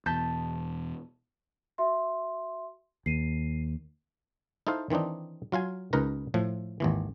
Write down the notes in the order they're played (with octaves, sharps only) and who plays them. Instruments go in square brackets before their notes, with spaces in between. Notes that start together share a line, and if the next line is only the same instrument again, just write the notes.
[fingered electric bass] E2 B2 [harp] A5 G6 B6
[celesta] F#4 E5 C6
[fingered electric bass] D#2 [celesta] C7 D#7
[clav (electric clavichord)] D#4 E4 A4 C5 F5
D#3 E3 C4 D4 D#4
F#3 F4 F5 G#5
C#2 D#4 A#4 B4 A#5
A2 F3
G#1 D#2 E3